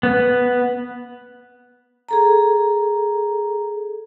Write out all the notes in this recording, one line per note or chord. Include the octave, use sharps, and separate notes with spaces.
B3
G#4 A4 A#5